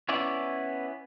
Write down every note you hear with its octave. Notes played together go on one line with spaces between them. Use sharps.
B3 C#4 E4 D5